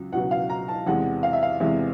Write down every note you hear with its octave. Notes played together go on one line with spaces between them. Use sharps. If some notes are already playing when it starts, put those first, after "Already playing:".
Already playing: C#2 F#3
C#2 B2 F#3 F#5
F5
A#5
A5
E2 C3 E3 G#3 F#5
F5
E5
F5
E2 C3 E3 G#3 E5